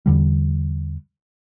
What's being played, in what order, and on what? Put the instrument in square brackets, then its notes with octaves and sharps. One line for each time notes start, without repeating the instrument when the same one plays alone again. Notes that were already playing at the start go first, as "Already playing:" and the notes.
[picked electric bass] E2 D3 G3